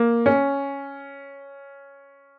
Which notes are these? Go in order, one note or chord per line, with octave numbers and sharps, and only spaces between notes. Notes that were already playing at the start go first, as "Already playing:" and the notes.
Already playing: A#3
C#4